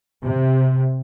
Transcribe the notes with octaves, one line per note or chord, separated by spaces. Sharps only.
C3